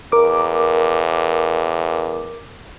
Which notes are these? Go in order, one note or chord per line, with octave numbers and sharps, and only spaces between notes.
E2 A#4 D6